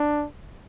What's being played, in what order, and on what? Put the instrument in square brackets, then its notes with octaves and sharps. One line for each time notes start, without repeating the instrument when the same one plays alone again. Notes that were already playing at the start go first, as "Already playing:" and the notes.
Already playing: [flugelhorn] D4